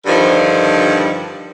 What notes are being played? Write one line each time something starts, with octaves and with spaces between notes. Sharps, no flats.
G2 D3 D#3 F3